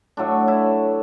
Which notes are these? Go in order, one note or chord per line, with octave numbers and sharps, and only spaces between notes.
A2 F#3 A3 D4
E4